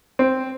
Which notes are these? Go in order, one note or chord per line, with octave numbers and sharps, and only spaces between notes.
C4